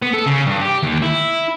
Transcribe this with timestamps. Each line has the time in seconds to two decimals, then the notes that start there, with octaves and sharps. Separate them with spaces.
0.02 B3
0.14 A4
0.26 C#3
0.46 G2
0.61 G4
0.83 D#2
1.02 E4